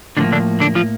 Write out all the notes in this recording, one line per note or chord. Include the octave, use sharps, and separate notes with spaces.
A2 D3 F3 A#3 D4
D3 D4
D3 D4
F3 F4